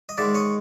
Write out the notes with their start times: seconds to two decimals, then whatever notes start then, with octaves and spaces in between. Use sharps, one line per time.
0.09 D#5
0.17 G#2 D#3 G#3 D5 E5
0.34 C#5 D#5